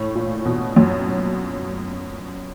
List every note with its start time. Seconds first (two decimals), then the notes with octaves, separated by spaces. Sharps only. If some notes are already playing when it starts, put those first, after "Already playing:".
Already playing: A2
0.15 A#2
0.45 B2
0.76 F#2